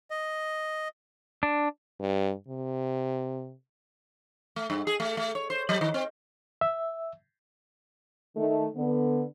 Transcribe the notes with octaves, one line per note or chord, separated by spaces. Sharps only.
D#5
D4
G2
C3
A3
G2
G#4
A3
A3
C#5
C5
F#3
D#3
C4
E5
D#3 A3
D3 B3